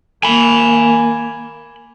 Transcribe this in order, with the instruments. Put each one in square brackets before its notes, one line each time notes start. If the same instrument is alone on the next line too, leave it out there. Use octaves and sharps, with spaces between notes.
[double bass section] A#3 [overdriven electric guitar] G#5 B5